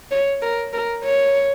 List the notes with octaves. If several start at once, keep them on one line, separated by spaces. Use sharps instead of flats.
C#5
A#4
A#4
C#5